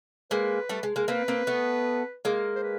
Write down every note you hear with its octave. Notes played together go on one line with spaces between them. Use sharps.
G#3 A#3 B4
G3 A3
G#3
G#3 A#3
A#3 C4 B4
A#3 C4
A3 B3
G#3 A#3
C5
B4